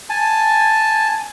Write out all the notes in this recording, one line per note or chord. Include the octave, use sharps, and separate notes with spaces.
G#5 A5